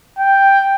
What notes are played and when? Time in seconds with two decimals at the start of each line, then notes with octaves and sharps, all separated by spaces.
0.19 G5